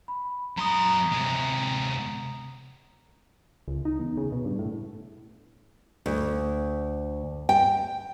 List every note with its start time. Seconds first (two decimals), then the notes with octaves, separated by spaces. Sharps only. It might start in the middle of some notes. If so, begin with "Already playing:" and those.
0.08 B5
0.57 F#2 A#5 C6 D#6
1.12 C3 G#3
3.68 C#2
3.85 D#4
4.00 E2
4.17 C#3
4.32 B2
4.45 G2
4.59 A2
6.06 D2
7.49 G5